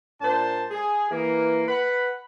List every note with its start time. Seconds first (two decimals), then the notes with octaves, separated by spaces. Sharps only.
0.21 A#2 D4 C5 A5
0.70 G#4
1.11 E3 A#3
1.68 B4 F#5 B5